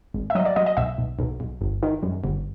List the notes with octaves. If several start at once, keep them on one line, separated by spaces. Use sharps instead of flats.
G#1
E5
F#3 D#5
D5
F#3 D#5
D#5
B1 E5
B1
B1
B1
G1
D#3
F#2
G1